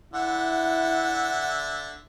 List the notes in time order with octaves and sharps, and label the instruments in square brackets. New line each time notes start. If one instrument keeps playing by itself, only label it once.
[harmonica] D3 E5 [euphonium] E4 [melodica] F#5